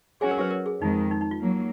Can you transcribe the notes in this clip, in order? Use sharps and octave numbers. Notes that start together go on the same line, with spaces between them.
F#3 C#4 F#4 G#4 C#5 G#5
A#4
B4
A#4
G#4
F2 D#3 G#3 D#4
D#4
D#4
F4
F#3 A#3